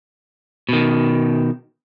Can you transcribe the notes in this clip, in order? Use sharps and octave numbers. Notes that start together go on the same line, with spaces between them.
B2 D#3